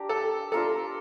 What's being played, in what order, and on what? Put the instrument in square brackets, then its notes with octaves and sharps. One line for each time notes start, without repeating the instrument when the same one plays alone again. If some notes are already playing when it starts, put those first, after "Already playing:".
Already playing: [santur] D4 G4 A#4
[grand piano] A4
[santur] D4 F4 A#4 F5 [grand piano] A4